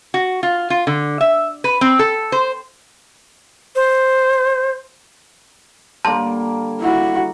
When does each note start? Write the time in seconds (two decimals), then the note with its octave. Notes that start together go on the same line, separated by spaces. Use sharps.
0.14 F#4
0.43 F4
0.70 F4
0.87 D3
1.21 E5
1.64 B4
1.81 C4
1.99 A4
2.32 C5
3.75 C5
6.05 D3 G3 A#3 A5 C6
6.81 E4 F#4